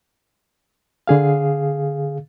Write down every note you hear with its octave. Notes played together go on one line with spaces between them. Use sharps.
D3 G#4 F5